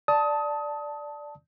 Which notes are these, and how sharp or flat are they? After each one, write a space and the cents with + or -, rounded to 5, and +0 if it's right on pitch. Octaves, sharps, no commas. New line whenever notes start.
D5 +0 A5 +0 D#6 +25